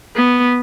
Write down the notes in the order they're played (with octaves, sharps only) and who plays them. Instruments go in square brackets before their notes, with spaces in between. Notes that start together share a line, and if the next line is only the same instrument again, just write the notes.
[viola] B3